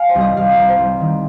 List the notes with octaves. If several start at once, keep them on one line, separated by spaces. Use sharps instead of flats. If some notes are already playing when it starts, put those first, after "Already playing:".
Already playing: F5 G#5
C5
C2
D#5
C2 F5
A#5
C2
C5
C2
D#3